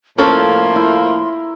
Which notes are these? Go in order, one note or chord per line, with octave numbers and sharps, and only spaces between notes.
A2 F3 A#3 C#4 A4 A#4 C6
E4